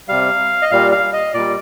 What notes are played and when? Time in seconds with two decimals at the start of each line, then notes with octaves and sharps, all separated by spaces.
0.08 C3 G3 F5
0.62 D#5
0.71 A#2 G3 F5
0.92 F5
1.13 D#5
1.34 A#2 G3 D5